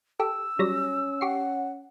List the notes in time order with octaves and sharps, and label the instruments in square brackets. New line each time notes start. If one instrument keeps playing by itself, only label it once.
[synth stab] G4 A4 [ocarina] E6
[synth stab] F#3 G3 A#6 [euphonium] C#4
[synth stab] G4 C#6 C7 [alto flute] F#5